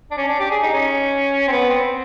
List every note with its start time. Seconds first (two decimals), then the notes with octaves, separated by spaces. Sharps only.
0.11 D4
0.17 C#4
0.28 D4
0.40 G4
0.51 G#4
0.63 D#4
0.73 C#4
1.48 C4
1.52 B3
1.70 C4